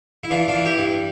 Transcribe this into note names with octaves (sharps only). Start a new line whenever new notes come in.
E4
E3 D4 F4
D4 F4
E3
E4 G4
G2